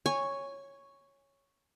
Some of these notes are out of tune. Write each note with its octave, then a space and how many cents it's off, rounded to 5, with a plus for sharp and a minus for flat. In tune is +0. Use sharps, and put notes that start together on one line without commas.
C#5 +0 G#5 -15